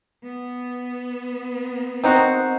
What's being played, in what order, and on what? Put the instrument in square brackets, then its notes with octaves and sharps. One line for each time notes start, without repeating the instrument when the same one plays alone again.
[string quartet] B3
[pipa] D#3 D#4 F#4 [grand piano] C4